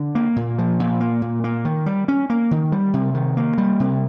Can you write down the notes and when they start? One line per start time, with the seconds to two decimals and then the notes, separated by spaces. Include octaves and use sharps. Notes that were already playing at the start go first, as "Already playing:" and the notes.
Already playing: D3
0.15 A#3
0.36 A#2
0.58 F3
0.80 A#2
1.00 A#3
1.22 A#2
1.44 A#3
1.65 D#3
1.86 G3
2.08 C#4
2.30 A#3
2.51 D#3
2.72 G3
2.94 C3
3.14 D#3
3.37 A#3
3.58 G3
3.80 C3